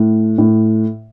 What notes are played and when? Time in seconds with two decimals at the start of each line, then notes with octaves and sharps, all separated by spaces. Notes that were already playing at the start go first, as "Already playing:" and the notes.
Already playing: A2
0.38 A2